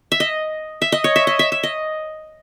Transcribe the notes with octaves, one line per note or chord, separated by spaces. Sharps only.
E5
D#5
E5
D#5
C#5
E5
D#5
E5
E5
D#5